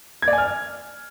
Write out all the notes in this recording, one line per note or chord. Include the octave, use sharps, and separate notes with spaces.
G#6
D5
G#5
F6